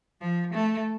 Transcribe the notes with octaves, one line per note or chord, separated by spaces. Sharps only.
F3
A3